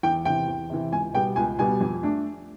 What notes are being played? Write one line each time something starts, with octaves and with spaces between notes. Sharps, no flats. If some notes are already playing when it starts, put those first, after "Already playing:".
E2 G5
C3 E3 G5
E2
C3 E3
C#2 G#5
B2 G3 B3 G5
C#2 G#5
B2 G3 B3 G#5
F2
A3 D4